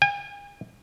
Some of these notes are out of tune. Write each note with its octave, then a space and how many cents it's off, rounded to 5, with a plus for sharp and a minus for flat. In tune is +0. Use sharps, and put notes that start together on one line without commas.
G#5 -45